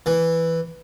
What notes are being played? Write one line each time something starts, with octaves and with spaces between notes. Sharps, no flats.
E3